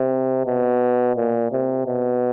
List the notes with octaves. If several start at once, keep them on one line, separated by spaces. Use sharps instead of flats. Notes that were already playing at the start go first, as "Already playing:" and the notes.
Already playing: C3
B2
A#2
C3
B2